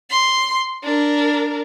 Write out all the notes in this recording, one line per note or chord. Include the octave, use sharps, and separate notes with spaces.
C6
D4 A#4